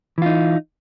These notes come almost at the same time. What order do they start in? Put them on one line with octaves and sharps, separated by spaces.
E3 F4 D#4